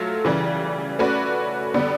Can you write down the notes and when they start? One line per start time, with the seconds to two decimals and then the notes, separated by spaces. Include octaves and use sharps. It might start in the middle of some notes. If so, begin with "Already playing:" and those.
Already playing: F#3 A3 F4
0.25 C#3 E3 G3
0.99 A3 C#4 F#4 B4 D5
1.74 D3 G3 B3